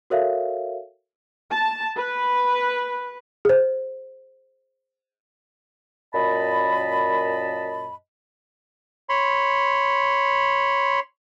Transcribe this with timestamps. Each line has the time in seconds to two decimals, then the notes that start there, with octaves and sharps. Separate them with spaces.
0.10 F#4 A4 A#4 C#5 E5 F5
1.50 A5
1.97 B4
3.45 G#4 C5
6.14 F#2 A#2 D#5 A5 B5
9.09 C#5 B5 C6